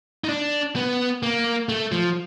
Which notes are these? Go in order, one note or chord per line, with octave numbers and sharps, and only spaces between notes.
D#4
D4
B3
A#3
A3
F3